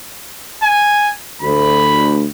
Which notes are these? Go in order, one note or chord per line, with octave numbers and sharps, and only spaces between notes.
G#5
D2 B5